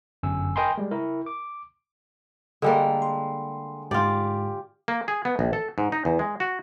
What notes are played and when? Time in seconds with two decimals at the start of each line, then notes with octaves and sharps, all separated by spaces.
0.23 G1 F#2 G#5 E6
0.56 A#4 D#5 G5 G#5 B5 C6
0.78 G3 G#3
0.91 E4 A#4
1.26 D6
2.62 D3 G3 G#3 A#3
3.02 C6
3.91 G#2 G#3 F4 G4 D5
4.88 A#3
5.08 G#4
5.25 B3
5.39 A#1
5.53 A4
5.78 G#2
5.92 D#4
6.05 E2
6.19 G#3
6.40 F#4